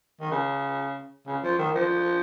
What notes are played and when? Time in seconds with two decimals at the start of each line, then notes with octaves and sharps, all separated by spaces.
0.21 D#3
0.32 C#3
1.27 C#3
1.43 F3
1.59 D#3
1.75 F3